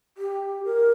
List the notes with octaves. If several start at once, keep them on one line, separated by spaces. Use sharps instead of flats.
G4
A#4